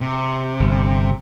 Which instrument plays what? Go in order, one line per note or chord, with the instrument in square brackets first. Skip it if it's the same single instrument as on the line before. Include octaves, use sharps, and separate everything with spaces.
[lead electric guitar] C3
[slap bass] G1